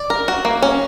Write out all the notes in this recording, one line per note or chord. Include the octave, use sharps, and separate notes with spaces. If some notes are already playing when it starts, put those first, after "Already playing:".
Already playing: D5
A#4
F#4
A#3
C#4